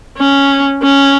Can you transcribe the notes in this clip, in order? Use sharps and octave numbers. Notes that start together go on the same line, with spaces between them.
C#4
C#4